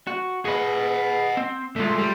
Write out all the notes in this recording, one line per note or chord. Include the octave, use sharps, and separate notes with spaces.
F#4
G#4 B4 D#5 F#5
C4
D3 G#3 A3 F4
G3